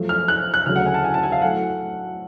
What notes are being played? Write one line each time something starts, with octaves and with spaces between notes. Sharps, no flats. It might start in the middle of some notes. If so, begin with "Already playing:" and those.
Already playing: F#2 F3 A3
F6
F#6
F#6
D2 C#3 F#3 A3 F6
F#5
G#5
A5
G#5
A5
G#5
F5
A2 F#3 A3 F#5